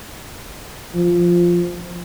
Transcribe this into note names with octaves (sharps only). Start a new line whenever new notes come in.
F3